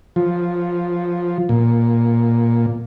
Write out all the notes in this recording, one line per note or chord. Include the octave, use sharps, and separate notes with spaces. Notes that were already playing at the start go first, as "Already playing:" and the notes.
F3
A#2